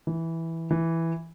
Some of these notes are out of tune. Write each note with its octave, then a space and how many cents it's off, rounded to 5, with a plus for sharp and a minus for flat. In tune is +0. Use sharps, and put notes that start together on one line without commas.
E3 -5
E3 +0